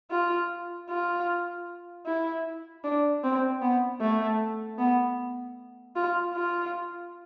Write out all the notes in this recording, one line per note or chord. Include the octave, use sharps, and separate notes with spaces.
F4
F4
E4
D4
C4
B3
A3
B3
F4
F4